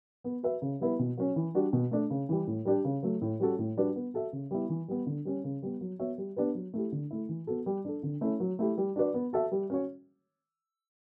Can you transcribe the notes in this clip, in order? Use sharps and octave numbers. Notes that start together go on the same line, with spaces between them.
B3
F#4 B4 E5
C#3
G3 B3 E4 B4
B2
F#3 C#4
E3
G3 D4 F#4
B2
A3 D4
C#3
E3 G3
A2
G3 D4 G4
C#3
F#3 A3
A2
G3 C#4 F#4 A4
A2
G3 D4 F#4 B4
B3
F#4 A4 E5
C#3
G3 B3 E4
E3
G3 B3
D3
G3 C#4
C#3
G3 B3
F#3
B3 F#4 C#5 E5
G3
B3 D4 G4 B4
F#3
A3 E4 G4
D3
A3 E4
E3
B3 F#4 A4
G3
D4 A4
D3
A3 C#4 E4
F#3
A3 E4 G4
G3
D4 F#4 B4 D5
B3
F#4 A4 E5
G3
C#4 F#4 C#5